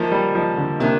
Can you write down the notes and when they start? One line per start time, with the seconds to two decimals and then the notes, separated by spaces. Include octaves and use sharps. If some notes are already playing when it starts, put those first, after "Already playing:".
Already playing: D#3 F3 A#3 D#4
0.12 G3
0.35 F3
0.58 D3
0.80 C3 D#3 A#3 D4